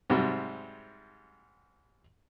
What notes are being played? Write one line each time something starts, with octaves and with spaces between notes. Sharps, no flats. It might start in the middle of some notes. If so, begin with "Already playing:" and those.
G#2 C3 F#3 G3